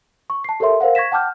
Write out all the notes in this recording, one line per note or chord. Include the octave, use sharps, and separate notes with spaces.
C#6
A5 C7
G4 A4 A#4 C#5 E5 C6
A#4 C5 F5 F#5
C#6 G#6 A#6 B6 E7
F#5 G5 A5 D6 F6 G6